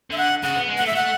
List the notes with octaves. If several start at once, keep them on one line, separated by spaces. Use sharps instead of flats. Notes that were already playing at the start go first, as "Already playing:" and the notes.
D3 E5
F#5
C#3 F#5
B3
G#3
A3 F#5
E5
A3 F#5